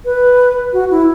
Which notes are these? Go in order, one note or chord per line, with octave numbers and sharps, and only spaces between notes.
B4
F#4
E4